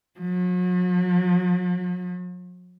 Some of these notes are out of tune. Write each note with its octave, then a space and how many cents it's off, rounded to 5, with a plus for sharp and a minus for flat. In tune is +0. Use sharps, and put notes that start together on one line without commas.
F#3 -45